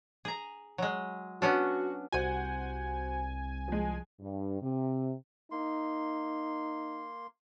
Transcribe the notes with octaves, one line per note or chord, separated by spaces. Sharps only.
G#4 A#5
F#3 G#3
B3 C#4 D4 F#4
C2 F#4 C5 F#5 G#5
F3 G#3
G2
C3
A#3 D#4 C6